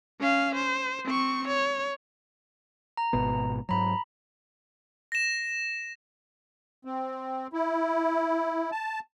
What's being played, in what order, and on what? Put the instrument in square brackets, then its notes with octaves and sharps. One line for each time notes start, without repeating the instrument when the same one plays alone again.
[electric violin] C#4 F5
C5
C4 C#6
C#5
[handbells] A#5
[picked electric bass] G#1 B2 B3
[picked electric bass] G#2 F#3 [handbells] A#5 B5
[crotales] A#6 E7
[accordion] C4
E4
A5